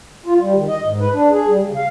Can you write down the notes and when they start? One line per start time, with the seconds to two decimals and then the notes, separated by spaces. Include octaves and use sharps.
0.26 F4
0.39 G3
0.55 D#3
0.68 D#5
0.83 G#2
1.00 B4
1.13 D4
1.30 G#4
1.47 G3
1.62 C#3
1.75 F5